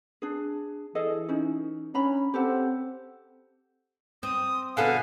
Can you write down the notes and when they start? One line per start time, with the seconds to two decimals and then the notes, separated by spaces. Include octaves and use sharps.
0.22 D4 G#4
0.95 E3 G#4 A4 D#5
1.29 C#4 D#4
1.94 C#4 D4 A#5 B5
2.34 C4 G4 A4 F#5
4.23 C4 D#6
4.77 B2 D3 B3 A4 F5 G#5